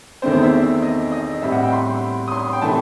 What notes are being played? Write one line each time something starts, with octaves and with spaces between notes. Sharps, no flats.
E2 D#3 A3 C4 C5
C5
E5
D#5
D#5
A2 G3 C4 E5
F#5
G5
C6
D#6
C6
G5
C3 E3 A3 A5